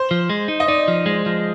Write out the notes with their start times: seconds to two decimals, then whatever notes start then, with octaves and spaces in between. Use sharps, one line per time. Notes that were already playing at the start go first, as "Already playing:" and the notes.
Already playing: C5
0.11 F3
0.30 G#3
0.48 D#4
0.60 D#5
0.68 D#4 D5
0.88 F3
1.06 G#3
1.26 F3